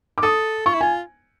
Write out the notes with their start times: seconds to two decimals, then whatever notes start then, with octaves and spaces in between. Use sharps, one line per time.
0.18 D6
0.23 A4 D#6
0.66 F4 C#6
0.74 E4
0.81 F4 G#5